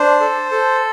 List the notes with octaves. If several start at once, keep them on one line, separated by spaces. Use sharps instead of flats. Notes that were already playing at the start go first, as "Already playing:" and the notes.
Already playing: D4 C5
A4
A4